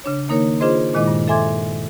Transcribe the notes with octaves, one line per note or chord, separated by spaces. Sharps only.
C#3 D4 C#5
D#3 A#3 D#4 A#4 C#5
D4 F4 G#4 C5 D#5 C6
A#2 D#3 G#3 E4 D#5 D6
G2
A4 E5 G#5 C6 D6 G#6